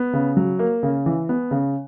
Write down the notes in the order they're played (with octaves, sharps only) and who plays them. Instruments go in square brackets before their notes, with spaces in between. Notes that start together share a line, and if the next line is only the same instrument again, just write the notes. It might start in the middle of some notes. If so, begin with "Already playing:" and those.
Already playing: [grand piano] B3
C#3
F#3
A#3
C#3
E3
B3
C#3